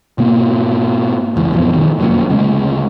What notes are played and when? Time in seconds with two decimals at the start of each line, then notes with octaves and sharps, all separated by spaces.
0.18 G#2 B2 A#3
1.36 F1 C#2 E3
1.52 A1 F2 G#2 B2
1.71 F#1 B1 C3 D#3
1.99 F1 F#2 A#2
2.29 D2 C#3 G#3